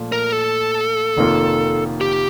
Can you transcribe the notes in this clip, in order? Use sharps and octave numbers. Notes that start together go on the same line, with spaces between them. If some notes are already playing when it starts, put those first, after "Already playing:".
Already playing: A#2 F3 A3
A#4
A4
F1 F2 D#3 A#3 F4
G4